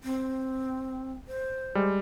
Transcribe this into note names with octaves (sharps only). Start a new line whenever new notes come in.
C4
C5
G3 G#3